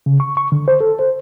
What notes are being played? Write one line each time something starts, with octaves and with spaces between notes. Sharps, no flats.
C#3
C#6
C#6
D3
C5
A4
C5